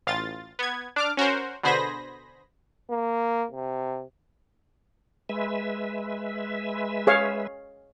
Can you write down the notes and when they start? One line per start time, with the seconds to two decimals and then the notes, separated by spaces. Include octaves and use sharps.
0.07 A1 F4 A6
0.59 B3 G#6
0.96 D4 D6 F6
1.17 C#4 F#4 A#4 C5
1.63 B2 D3 G#4 C5 B5 A#6
2.90 A#3
3.52 C3
5.29 G#3 B4 E5
7.07 G#4 C#5 F5